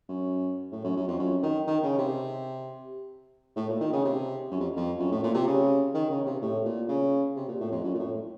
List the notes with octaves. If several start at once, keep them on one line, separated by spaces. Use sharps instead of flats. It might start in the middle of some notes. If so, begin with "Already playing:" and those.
F#2
A2
F#2
F#2
F2
F#2
D#3
D#3
C#3
C3
A2
A#2
D#3
C#3
C3
F#2
F2
F2
F#2
A2
A#2
C3
C#3
D#3
C#3
C3
A2
A#2
C#3
C3
A#2
A2
F2
F#2
A#2
A2